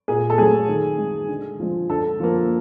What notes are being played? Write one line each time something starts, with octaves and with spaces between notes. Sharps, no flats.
A#2 G#4
A4
F#3 A3 G#4
D#3
G#3
D3
F3 G#3
D3 A4
F3 A#3